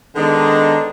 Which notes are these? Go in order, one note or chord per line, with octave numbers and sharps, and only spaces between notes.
D3 D#3 G#3 B3 D4 D#4